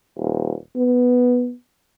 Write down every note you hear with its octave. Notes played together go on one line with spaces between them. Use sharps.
D#1
B3